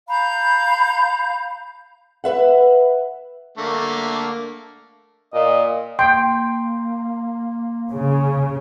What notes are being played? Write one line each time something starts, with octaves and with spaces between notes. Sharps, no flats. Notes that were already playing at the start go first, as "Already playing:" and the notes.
F5 A#5 B5 G6
B4 E5 F#5
D3 A3 A#3
A#2 D#5
A#3 G5 C6
C#3